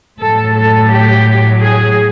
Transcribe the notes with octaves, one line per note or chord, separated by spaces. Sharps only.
A2 F#3 A4
A4
G4
G#4